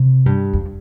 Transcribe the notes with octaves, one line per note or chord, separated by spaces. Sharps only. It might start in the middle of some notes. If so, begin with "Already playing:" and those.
Already playing: C3
G2
F2